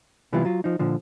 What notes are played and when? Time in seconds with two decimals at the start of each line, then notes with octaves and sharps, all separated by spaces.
0.32 C3 E3 G3 B3 E4 F4
0.45 F#3 F4
0.64 F3 D#4
0.79 A#2 D3 F3